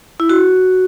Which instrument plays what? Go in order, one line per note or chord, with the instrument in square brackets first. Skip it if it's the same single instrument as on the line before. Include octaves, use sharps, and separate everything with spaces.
[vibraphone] E4
F#4